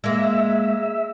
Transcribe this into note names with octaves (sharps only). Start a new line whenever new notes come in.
G#3 A#3 E5